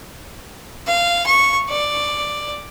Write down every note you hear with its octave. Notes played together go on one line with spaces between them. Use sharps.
F5
C#6
D5